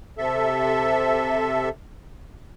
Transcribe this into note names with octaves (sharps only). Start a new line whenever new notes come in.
C3 A4 E5